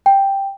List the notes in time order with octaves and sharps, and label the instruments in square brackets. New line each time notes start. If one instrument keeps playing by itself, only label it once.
[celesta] G5